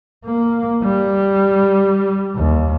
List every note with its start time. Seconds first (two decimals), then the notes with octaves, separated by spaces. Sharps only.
0.25 A#3
0.82 G3
2.36 D#2